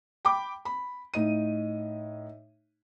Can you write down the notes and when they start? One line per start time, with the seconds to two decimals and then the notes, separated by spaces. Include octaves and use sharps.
0.25 G5 B5 D6
0.65 B5
1.14 A2 D#4 D#7